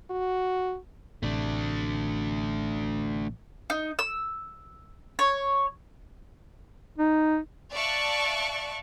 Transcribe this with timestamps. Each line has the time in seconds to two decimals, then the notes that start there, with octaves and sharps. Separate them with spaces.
0.10 F#4
1.23 A1 C3 A3 D4
3.70 D#4
3.99 E6
5.19 C#5
6.98 D#4
7.72 D5 E5 F5 A5 C#6 F#6